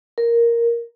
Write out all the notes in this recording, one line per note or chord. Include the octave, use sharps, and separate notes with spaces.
A#4